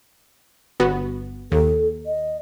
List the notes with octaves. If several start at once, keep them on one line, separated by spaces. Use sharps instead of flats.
G1 B3 F#4
D#2 A4
D#5